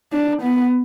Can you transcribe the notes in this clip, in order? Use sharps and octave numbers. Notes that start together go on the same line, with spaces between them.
D4
B3